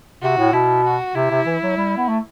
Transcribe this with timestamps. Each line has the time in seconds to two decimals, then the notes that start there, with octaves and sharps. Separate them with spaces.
0.22 C3 F#4
0.38 A2
0.53 B2 E4
0.85 F#4
1.15 C3 E4
1.30 C3
1.46 E3
1.63 F#3
1.77 G3
1.97 B3
2.08 A3